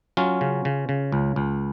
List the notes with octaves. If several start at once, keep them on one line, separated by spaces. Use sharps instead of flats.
F#3 C#4 F4
C#3
C#3
C#3
C#2
C#2